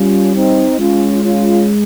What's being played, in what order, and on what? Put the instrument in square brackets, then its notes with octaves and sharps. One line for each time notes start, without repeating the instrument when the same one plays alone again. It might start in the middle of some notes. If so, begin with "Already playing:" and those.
Already playing: [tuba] G3 [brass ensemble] C#4 F4
[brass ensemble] C4 D#4
[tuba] G#3 [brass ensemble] C#4 F4
[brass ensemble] C#4 F4